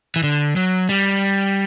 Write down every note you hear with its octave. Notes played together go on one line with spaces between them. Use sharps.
E3
D3
F#3
G3